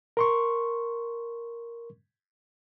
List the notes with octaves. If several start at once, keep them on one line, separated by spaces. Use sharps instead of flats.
A#4 C6 C#6